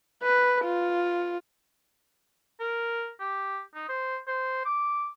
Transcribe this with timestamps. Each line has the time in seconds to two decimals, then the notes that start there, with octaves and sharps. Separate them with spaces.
0.23 B4
0.64 F4
2.60 A#4
3.20 G4
3.75 D#4
3.89 C5
4.27 C5
4.66 D6